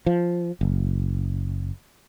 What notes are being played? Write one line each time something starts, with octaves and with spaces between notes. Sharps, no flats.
F3
F#1